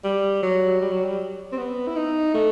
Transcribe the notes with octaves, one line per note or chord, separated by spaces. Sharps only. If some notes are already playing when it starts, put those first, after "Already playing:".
G3
F#3
G3
F#3
G3
C4
B3
E4
D#4
A3